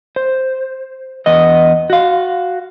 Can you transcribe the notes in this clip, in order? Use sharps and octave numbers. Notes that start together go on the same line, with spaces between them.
C5
E2 B3 D#5
F#4 F5